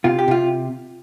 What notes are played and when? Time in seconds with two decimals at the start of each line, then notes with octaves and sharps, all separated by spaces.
0.04 C3 F4
0.19 G4
0.28 C3 F4